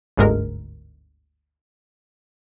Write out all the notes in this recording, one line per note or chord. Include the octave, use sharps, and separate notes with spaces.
G1 D2 G#2 G#3 A#4